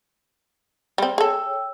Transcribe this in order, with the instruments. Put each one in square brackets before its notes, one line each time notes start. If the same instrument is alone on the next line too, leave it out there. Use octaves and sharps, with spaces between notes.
[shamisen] G3 C4
[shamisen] G#4 A4 [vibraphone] C#5 G5 E6